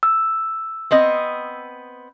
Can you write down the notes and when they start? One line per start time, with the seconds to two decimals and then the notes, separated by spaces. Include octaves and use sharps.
0.03 E6
0.91 B3 C4 D#5